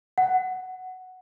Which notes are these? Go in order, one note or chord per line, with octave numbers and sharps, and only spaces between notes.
F#5